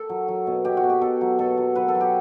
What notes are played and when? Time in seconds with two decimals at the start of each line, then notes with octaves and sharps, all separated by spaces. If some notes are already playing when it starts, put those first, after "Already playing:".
Already playing: A4
0.09 F#3
0.28 F#3
0.47 B2
0.65 B2 G4
0.77 F#4
0.84 B2
0.90 G4
1.02 B2 A4
1.21 F#3
1.39 B2 A4
1.58 F#3
1.76 F#3 B4
1.88 A4
1.95 F#3
2.01 G4